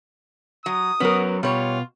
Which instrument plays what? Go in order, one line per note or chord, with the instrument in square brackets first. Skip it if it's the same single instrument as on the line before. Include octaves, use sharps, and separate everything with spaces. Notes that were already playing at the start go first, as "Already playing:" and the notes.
[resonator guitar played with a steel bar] F#3 [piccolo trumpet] D#6
[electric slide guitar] F#3 C#4 [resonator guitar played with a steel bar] B3 A#4
[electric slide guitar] B2 [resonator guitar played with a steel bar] G3 C#5 [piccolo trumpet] F4